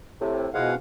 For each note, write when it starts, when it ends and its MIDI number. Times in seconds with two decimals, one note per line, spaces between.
0.20 0.47 45
0.20 0.47 48
0.54 0.75 47
0.54 0.71 52
0.54 0.71 53
0.54 0.71 56
0.54 0.75 77
0.54 0.75 78